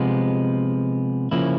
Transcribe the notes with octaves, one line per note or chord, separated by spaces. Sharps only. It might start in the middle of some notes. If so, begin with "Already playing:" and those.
Already playing: C3 F3 G#3 B3
C#3 F3 A#3 C#4 E4